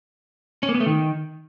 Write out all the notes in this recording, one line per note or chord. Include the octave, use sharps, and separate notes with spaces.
C#4
A#3
B3
A3
D#3